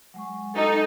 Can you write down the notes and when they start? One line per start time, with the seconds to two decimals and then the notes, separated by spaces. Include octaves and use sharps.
0.14 F#3 G#3 C#6
0.55 D#4 A4